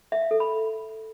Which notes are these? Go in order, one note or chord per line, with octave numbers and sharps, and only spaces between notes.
E5
F5
A4
B5